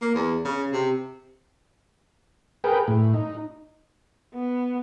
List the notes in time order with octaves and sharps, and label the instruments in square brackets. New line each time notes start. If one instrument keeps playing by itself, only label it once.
[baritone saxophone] A#3
E2
C#3
C3
[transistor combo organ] G#4 A#4 B4 G5
A2
D#4
[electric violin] B3